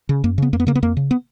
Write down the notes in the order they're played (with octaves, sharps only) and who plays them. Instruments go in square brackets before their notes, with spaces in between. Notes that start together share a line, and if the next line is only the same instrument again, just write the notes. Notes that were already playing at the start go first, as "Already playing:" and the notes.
[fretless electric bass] C#3
F#2 A#3
C#3 B3
F2 A#3
B3
C#3 A#3
B3
F2 A#3
C#3
B3